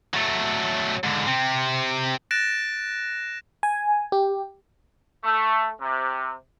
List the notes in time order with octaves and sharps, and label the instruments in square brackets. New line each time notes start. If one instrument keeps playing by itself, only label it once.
[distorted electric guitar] F#3 A3
G#2 D3
C3 C4
[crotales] F#6 A6 A#6 D7 E7
[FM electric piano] G#5
G4
[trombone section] A3
C3